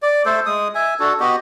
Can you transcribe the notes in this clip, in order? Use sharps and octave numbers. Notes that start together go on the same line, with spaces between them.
D5
A3 A4 C5
G#3 D#6
E5 G#5
D4 F#4 A4
B3 F#4 G4 D#5